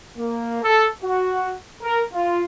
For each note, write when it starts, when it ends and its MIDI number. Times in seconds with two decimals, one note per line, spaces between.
0.17 0.60 58
0.63 0.88 69
1.03 1.53 66
1.82 2.01 70
2.12 2.43 65